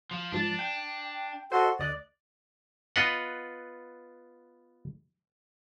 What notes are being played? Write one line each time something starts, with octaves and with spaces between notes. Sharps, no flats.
F3
G#2 F3 D4 A6
G5
F#4 A4 C5 D#5 C6
D2 D5 D#5 F#6
B3 F4 B4 D#5 F#5